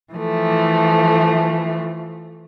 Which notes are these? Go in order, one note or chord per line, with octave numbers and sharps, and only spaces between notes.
E3 F3 A3